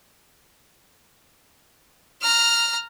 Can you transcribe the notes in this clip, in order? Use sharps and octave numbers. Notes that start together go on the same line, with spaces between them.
A#5 F6